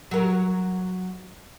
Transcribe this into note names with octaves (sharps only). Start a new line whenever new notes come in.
F#3 A#4